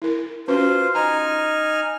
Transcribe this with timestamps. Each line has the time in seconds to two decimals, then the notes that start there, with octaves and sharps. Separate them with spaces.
0.02 E4 A#4
0.48 C#4 F4 F#4 B4 C5
0.95 D#4 G#5 A#5 F6